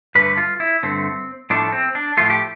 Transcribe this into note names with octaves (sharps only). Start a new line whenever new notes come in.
G2 D3 A3 B4
F4
E4
G2 D3 A3 C4
A2 F3 A3 D4
C4
D4
A2 F3 A3 F4
G4